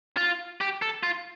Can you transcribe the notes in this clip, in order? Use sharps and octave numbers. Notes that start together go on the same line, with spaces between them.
F4
G4
A4
F4